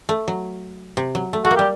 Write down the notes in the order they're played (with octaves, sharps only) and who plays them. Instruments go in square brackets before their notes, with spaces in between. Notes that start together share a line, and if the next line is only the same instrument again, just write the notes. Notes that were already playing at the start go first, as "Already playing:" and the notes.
[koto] A3
F#3
C3
F#3
A3
[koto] A3 [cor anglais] F#4
[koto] A#3
[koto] G3 [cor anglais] G4